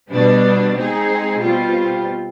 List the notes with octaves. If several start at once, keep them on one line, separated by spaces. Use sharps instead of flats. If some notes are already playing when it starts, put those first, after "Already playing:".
B2 G3 B3 D4
G#3 C4 D#4 G#4
B2 G3 C4 F4